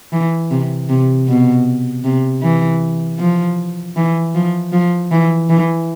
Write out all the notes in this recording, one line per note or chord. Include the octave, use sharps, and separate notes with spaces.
E3
C3
C3
B2
C3
E3
F3
E3
F3
F3
E3
E3